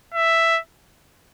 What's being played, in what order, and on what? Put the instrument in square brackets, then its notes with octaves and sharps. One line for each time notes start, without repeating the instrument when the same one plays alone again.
[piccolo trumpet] E5